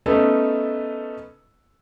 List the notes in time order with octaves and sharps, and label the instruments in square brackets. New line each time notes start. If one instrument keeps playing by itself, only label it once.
[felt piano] A3 B3 C#4 D#4 A4